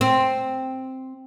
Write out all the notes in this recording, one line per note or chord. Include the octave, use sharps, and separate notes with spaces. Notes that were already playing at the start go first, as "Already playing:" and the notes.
C4